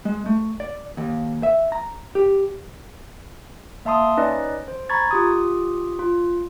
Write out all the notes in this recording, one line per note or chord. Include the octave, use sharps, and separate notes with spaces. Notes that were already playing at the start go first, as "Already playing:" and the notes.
G#3
A3
D5
D#2
E5
A#5
G4
A#3 E5 A5 C6 D#6
C#4 D#4 B4 D5 D#5
C5
A#5 B5 C#6 G#6 A6
F4 G4 D#6
F4